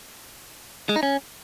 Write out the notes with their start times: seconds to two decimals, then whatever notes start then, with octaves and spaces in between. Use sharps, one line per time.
0.89 G#3
0.96 D#4
1.03 C#4